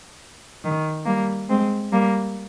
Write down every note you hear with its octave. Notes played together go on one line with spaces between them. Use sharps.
D#3
G3 A#3
G#3 C4
G3 A#3